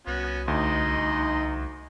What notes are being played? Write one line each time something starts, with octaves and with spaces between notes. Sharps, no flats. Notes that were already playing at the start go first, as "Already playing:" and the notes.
C2 B3 C#4 F#4
D2 D#4 D#5 C6
C2